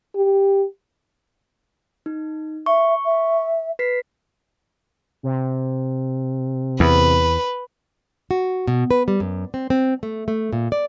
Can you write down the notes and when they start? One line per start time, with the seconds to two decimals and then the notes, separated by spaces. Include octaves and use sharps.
0.16 G4
2.06 D#4
2.66 E5 C#6
3.05 E5
3.79 B4 B6 C7
5.23 C3
6.80 E2 B4
8.31 F#4
8.68 B2
8.91 B4
9.08 G3
9.20 F#2
9.54 C4
9.70 C4
10.03 A3
10.28 A3
10.53 A#2
10.72 D5